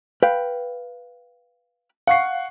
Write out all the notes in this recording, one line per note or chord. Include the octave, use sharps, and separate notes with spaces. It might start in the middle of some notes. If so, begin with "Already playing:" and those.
B4 F5 G5
F5 F#5 C#6 C7